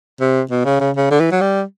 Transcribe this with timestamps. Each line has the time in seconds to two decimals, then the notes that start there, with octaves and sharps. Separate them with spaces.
0.20 C3
0.51 B2
0.65 C#3
0.80 C#3
0.96 C#3
1.11 D3
1.20 E3
1.31 F#3
1.41 G3